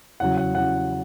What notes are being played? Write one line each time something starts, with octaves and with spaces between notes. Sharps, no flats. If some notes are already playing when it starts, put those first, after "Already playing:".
E2 C#3 F#3 F#5
F#5
E2 C#3 F#3 F#5